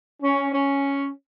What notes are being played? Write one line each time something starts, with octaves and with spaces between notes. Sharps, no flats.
C#4
C#4